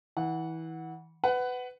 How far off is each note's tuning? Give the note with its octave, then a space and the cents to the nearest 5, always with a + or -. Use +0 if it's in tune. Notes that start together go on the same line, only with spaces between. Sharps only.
E3 -25 F#5 +0
B4 +20 F#5 +15